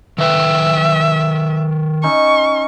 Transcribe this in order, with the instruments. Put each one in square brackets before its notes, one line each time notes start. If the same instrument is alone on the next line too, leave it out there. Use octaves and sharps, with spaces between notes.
[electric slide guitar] D#3 B4 G5 [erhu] E5
[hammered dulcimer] C#4 D#4 E5 [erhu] C#6